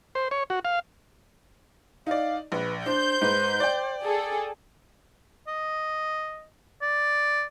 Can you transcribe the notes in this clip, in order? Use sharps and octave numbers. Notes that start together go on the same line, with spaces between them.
C5
C#5
F#4
F5
D#4 D5 F5
A#1 B4
D4 C5 G6
G#2 B4
D5 G5
G#4 A4
D#5
D5